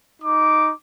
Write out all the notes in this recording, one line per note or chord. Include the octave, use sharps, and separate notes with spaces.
D#4 D6